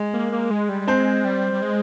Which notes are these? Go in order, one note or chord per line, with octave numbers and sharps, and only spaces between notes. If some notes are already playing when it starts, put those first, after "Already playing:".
Already playing: G#3
A#3
A#3
G#3
G3
G#3 C4 C5
G3
G3
G#3